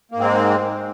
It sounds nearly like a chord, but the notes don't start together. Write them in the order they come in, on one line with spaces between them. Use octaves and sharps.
A#3 G#2 C4 G#3